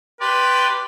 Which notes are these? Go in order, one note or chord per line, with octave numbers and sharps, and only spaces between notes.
G4 B4 D5 C6